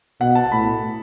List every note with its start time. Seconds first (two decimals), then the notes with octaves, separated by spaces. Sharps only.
0.21 B2 F#5
0.35 A5
0.52 A2 B5